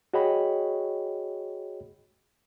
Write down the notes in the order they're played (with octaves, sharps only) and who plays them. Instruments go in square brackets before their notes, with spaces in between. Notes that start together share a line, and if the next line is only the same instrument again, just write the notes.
[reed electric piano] F#4 G#4 C#5 D#5 G5 B5